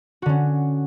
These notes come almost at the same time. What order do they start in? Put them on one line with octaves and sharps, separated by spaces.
F#4 D3 C#4